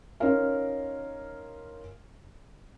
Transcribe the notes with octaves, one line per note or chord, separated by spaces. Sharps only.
C#4 D#4 F4 A#4 F5